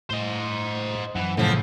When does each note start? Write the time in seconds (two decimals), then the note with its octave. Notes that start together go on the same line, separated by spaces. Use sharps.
0.10 A2 C5 D#5
1.15 F#2 E3 F#5
1.37 A2 C#3 E3 F3